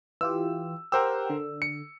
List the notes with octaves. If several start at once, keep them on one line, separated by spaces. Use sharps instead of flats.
E3 F4 G4 E6
G4 A#4 C5 F#5 G5 E6
D3
C#7